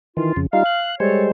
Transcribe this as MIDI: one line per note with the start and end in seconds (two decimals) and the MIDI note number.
0.17 0.33 51
0.17 0.33 52
0.17 0.39 65
0.36 0.47 41
0.36 0.47 49
0.53 0.63 55
0.53 0.63 63
0.53 0.63 65
0.53 0.92 77
0.66 0.95 90
1.00 1.31 55
1.00 1.31 56
1.00 1.24 69
1.00 1.31 72
1.00 1.24 73